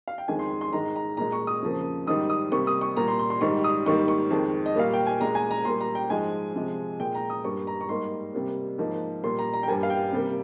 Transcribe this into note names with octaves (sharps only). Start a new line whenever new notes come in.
F5
G5
F2 D#3 G#3 G#5
C6
C6
C6
G#2 D#3 G#3 A#5
A#5
A#2 G#3 A#5
C#6
D#6
F2 C#3 F3 A#3
G#2 D#3 G3 D#6
D#6
C3 G3 A#3 C#6
D#6
C#6
A#2 G3 A#3 A#5
C6
C6
C6
G#2 D#3 G3 C#6
D#6
G#2 D#3 G3 A#3 C#6
C#6
F2 D#3 G#3
D#5
A#2 G3 A#3 F5
G5
G#5
A#2 G#3 A#5
G#5
A#5
A#2 G3 A#3 C6
A#5
G5
G#2 F3 G#3 G#5
C3 F3 G#3
A#2 G#3 G5
A#5
D#6
G2 G3 A#3 C#6
A#5
C#6
G#2 G3 A#3 C6
C3 G3 A#3
G#2 F3 A#3
A#2 G3 A#3 C6
A#5
A#5
G5
G2 G3 A#3 G#5
F5
G5
C3 G3 A#3